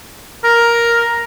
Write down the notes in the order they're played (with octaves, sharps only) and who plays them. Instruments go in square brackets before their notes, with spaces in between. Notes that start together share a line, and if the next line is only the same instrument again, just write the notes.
[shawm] A#4